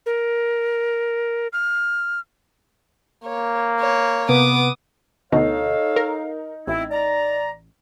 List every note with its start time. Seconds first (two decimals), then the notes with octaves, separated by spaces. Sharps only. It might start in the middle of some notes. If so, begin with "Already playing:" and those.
0.06 A#4
1.53 F6
3.24 A#3 C#5
3.81 C#5
4.29 C3 B3 D6 D#6
5.32 D2 B2 D#4 A4 C#5 F5
5.96 A#4
6.67 A1 C4 E4
6.91 D5 A#5